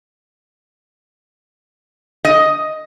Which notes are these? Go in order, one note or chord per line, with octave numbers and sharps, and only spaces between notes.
D#5